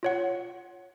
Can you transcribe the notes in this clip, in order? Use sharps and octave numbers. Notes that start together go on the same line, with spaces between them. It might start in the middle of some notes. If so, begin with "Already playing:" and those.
F4 C#5 F#5